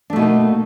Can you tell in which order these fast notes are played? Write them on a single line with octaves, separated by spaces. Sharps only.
D4 A3 B2 D#4 A#3